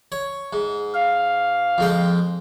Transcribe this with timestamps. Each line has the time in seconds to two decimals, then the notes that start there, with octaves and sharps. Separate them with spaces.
0.12 C#5
0.53 G#2
0.94 F5
1.78 F2 G#3 G5